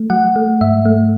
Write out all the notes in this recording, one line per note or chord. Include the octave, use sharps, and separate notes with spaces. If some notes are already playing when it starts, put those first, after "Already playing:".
Already playing: A3
F#3 F#5
A3
G#2 E5
A3